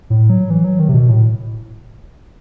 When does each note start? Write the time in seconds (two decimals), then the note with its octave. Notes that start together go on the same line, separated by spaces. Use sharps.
0.10 A2
0.30 F#3
0.50 E3
0.64 F#3
0.79 D#3
0.88 C3
0.94 B2
1.09 A2